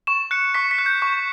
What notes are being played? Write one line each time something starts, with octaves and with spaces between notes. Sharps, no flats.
C#6 E7
F#6 C#7
C#6 B6
B6
F#6
G6
C#6